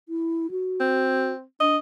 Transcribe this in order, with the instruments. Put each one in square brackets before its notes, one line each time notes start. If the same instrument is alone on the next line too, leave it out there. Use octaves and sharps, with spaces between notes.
[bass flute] E4
F#4
[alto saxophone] C4
[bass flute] D4 [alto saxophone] D#5